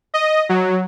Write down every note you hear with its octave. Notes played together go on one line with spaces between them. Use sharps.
D#5
F#3